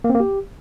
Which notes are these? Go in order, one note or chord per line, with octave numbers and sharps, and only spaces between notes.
A#3
C4
A#3
G4